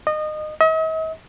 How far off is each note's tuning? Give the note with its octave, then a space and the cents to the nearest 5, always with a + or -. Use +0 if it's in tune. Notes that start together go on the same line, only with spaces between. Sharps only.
D#5 -25
D#5 +45